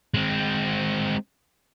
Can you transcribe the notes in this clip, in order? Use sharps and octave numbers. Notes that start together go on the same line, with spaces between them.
G#3 C4